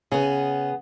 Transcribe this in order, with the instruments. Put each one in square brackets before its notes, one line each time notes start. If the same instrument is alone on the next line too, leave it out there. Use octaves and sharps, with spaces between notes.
[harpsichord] C#3 [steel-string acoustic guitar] B3 G#4